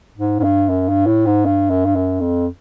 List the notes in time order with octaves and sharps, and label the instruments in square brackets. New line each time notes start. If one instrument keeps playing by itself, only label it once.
[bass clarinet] G#2
G#2
G2
F#2
G2
A2
G#2
G2
F#2
G2
F#2
F2